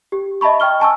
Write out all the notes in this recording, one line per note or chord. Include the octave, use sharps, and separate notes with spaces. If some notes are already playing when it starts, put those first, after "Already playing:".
G4
D#5 E5 A5 B5 C#6
D#5 G5 C#6 F6 G7
G#5 A5 C#6 E6